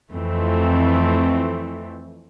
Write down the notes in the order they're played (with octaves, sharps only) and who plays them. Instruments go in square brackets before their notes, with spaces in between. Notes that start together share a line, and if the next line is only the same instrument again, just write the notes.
[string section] F2 E3 A3 C4